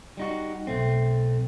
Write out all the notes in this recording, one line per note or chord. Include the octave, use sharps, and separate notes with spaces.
G3 D#4 F#4
B1 A3 C4